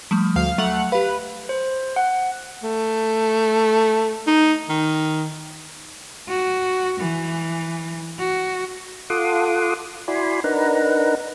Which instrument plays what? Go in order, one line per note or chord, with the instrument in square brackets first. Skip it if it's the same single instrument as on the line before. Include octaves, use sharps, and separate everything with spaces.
[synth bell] F3 G3 A3
[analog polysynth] D2 F5
[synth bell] F#3 F7 F#7 [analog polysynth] A3 F#5
[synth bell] G4 F5 [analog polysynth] B4
[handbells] C5
F#5
[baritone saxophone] A3
D#4
D#3
[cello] F#4
E3
F#4
[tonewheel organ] F4 A4 F#5 C6 D6 D#6
E4 F#4 D5 G#5 B5 C6
D4 D#4 A#4 B4 F#5 A#5